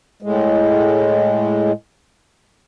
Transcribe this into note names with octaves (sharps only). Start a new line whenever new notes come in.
A2 G#3